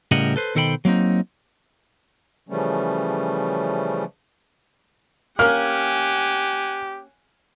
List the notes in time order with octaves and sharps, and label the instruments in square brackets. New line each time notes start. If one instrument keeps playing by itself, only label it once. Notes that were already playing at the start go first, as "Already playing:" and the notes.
[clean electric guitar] A2 C#3 G3 A#4 D#5 F#5
A4 B4 C5
B2 D#3 A4 C5 G5 B5
F#3 A#3 C4 D#4
[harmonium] C#3 E3 F3 G3 A3 C#4
[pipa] A#3 C#4 [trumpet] G4 [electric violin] F#5 G#5 [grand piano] F6